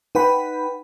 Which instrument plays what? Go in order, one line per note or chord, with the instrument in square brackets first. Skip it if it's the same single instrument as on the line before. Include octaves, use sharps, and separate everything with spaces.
[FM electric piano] D#4 B4 F#5 G5 B5